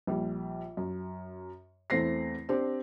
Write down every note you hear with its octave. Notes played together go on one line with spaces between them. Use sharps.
A#1 G3
F#2
E2 A3 C4 A#6 C7
C4 D4 G4